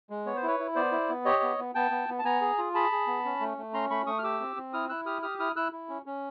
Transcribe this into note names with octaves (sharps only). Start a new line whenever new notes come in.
G#3
B3 C#5
C5
E4 B4 C#5
E4
B3 C5 D5
E4
B3
G4 C#5 D#5
B3
B3
B3 G5 A5
B3
B3
A5
B3 G#5 A#5
G#4
F4
G#4 A5 B5
G#4
B3
C#4
A3
A3
C#4 A#5 C6
A3 B5 C#6
A3 C#6 D#6
F6
G4 D6 E6
C4
C4
E4 D#6 F6
E4 E6 F#6
G4 D#6 F6
G4 D#6 F6
E4 D#6 F6
E4 E6 F#6
E4
C#4
C#4